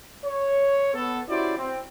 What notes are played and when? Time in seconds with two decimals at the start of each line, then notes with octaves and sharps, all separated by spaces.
0.25 C#5
0.94 B3 A4
1.29 C#4 E4 F#4 G4 C5 D5
1.58 C4